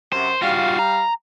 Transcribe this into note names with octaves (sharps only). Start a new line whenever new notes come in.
F#2 C3 C5
G3 F4 F#4 F5
A#5